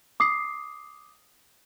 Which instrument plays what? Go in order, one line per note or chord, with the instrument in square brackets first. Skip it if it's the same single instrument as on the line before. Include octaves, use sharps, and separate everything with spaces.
[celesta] D6 D#6 C7